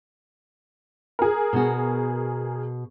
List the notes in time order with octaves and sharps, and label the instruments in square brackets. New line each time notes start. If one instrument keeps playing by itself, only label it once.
[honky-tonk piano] G#4 A#4
[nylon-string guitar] B2 F#4